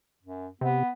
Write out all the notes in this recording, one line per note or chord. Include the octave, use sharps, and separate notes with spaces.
F#2
C3 B3